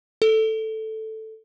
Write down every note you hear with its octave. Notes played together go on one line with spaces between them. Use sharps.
A4